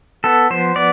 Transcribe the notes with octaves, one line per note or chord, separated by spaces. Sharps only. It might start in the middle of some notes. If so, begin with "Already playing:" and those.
B3 A4
F3 C5
B3 D5